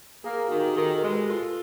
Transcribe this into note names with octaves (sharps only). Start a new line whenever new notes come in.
A#3 G#4
D#3 F#4
G4
G#4
D#3 A4
A#4
G#3
B4
F4 A4